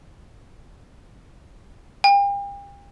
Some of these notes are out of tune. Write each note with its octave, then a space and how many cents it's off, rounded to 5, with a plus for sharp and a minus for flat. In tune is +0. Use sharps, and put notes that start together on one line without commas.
G5 +40